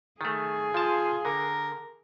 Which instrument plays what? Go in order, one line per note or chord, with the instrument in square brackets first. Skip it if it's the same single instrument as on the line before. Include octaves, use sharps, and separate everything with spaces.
[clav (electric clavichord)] D#3 A3 [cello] G#4
[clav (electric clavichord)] F3 A5 [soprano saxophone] F4
[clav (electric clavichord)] D3 [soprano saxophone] A#4